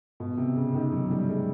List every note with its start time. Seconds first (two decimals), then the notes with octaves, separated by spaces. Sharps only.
0.20 B2
0.37 C3
0.56 C#3
0.75 D#3
0.92 F#3
1.11 G3
1.29 G#3